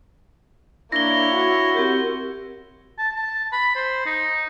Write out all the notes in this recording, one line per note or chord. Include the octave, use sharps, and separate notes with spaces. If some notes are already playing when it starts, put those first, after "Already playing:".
A#3 D4 E4 C#5 A#6 G7
F#4
C4 G4 A#4
A5
A5
B5
C5
D#4